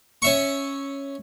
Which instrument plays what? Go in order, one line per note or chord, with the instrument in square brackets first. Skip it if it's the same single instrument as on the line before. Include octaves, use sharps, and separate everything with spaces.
[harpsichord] C#4 E5 C#6